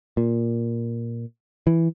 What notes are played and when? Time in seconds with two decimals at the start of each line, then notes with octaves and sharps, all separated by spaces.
0.17 A#2
1.67 E3